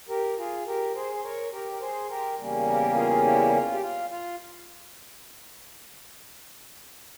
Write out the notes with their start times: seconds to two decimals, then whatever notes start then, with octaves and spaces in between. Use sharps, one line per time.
0.09 G4 A#4
0.38 F4 G#4
0.66 G4 A#4
0.95 G#4 C5
1.14 C5
1.23 A#4 C#5
1.52 G4 A#4
1.72 A#4
1.81 G#4 C5
2.09 G4 A#4
2.38 E2 C#3 G3 A#3 C#4
2.67 G4 A#4
2.95 F4 G#4
3.24 E4 G4
3.52 F4
3.73 G4
3.81 F4
4.10 F4